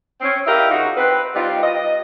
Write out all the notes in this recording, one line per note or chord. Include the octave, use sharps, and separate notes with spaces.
C4 C#4
E4 G4 A#4 D#5 F5
C#3 D#4 F4 F#4
C4 B4
G3 C4 D#4 F4
D#5